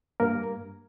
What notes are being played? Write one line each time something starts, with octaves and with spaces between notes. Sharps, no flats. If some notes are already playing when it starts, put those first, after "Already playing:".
G2 A#3 A#4